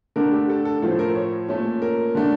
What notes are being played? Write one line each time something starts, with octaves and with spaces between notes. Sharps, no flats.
D3 A3 D4 A#4
G4
A4
A4
A2 F3 A3 A4
A#4
C#5
A#2 A3 C#4
A#4
D3 A3 D4